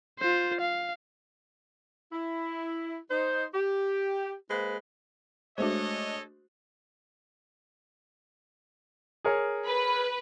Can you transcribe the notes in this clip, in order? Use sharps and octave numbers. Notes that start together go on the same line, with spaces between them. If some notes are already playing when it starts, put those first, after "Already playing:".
F4 C5
F5
E4
D#4 C5
G4
G#3 A#3 B4 C5
G#3 A3 D4 F#4 A4 C5 C#5 D#5
G#4 A#4 C#5
B4